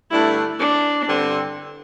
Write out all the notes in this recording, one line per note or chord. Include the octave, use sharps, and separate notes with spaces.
G2 D3 A3 D4 E4
D4
G2 D3 C4